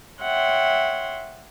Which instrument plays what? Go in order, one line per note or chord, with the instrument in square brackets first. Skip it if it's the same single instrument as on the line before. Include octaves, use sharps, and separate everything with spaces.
[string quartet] C#5 E5 F#5 G5 C6